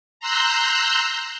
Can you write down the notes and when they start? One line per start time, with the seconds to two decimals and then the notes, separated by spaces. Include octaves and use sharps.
0.20 A#5 C6 E6 F#6 G6